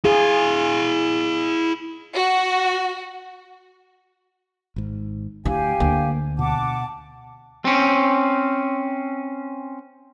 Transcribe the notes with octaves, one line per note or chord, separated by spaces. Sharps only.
E4 G#4 F5
F#4
G#1 G#2
D2 E3 G4 F5 G#5
D2 A#3
B2 F#5 A5 D6
C4 C#4